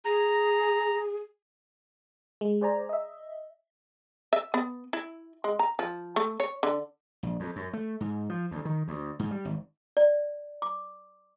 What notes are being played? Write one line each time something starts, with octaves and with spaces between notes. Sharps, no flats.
G#4 A#5
G#3
G#4 C5 D5 G#5 A#5
D#5 E5
E5
B3
E4
G#3
A#5
F3
A3
C#5
D3
A#1
F2
F#2
A3
G#2
F3
D2
D#3
D2
G#2
G3
G#1
D5
D6